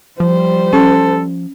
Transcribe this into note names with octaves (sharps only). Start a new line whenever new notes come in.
F3 G3 C5
C#4 A4